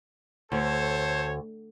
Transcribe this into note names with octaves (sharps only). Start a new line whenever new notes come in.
D2 A4 C5 C#5